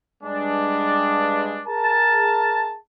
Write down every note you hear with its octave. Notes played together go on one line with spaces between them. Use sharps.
G2 G#3 D4
G#4 A#4 A5